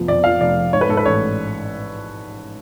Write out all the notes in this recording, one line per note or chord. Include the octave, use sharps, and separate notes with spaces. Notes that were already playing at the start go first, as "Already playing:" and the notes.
Already playing: F1 F3 B3
F2 D5
F3 F5
F1 D5
F3
G#2 C#5
B4
G#2 A4
B4
A1 C#5